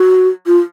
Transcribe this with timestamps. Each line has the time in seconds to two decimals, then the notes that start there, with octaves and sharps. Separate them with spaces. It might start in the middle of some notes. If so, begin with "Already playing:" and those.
Already playing: F#4
0.47 F4